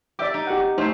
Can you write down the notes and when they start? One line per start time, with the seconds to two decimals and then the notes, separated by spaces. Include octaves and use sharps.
0.19 G4 D5 E5 D6
0.34 D#4
0.47 G4 F#5
0.78 A3 D#4 C5